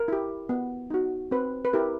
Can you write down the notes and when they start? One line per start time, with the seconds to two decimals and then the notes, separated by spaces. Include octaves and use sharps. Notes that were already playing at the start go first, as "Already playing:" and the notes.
Already playing: A#4
0.08 E4 G4
0.49 B3
0.90 D#4 F#4
1.31 C4 B4
1.65 B4
1.73 E4 G4 A#4